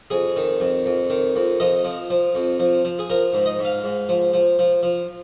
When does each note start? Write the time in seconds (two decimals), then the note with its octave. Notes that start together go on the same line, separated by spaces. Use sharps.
0.10 F2 G#4
0.36 D#3
0.60 F2
0.86 F2
1.10 D#3
1.36 F2
1.60 F3 D#5
1.84 F3
2.10 F3
2.35 F2
2.60 F3
2.85 F3
2.99 G#4
3.10 F3 A#4
3.33 G#2
3.46 D#5
3.59 G#2
3.65 F5
3.84 G#2
4.09 F3
4.33 F3
4.59 F3
4.83 F3